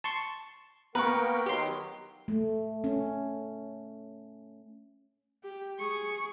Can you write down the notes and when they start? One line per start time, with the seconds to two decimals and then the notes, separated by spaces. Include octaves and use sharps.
0.04 A5 C6 C#6
0.95 A#3 B3 A#4 B4 G5 A#5 C#6
1.46 D#3 F#3 G4 C6
2.28 A3
2.84 C#4
5.44 G4
5.79 G#4 C#6